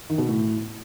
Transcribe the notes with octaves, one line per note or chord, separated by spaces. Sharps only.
D#3
B2
A2